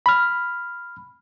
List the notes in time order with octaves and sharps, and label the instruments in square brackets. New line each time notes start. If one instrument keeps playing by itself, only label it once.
[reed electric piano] B5 F6